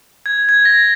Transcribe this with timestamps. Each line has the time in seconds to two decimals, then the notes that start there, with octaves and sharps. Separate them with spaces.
0.26 G#6
0.49 G#6
0.65 A#6